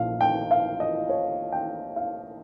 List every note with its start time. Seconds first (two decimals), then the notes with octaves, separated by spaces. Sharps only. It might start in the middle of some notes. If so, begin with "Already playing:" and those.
Already playing: A#1 A#2 F5
0.21 G5
0.51 F5
0.80 D#5
1.10 C#5
1.52 G5
1.96 F5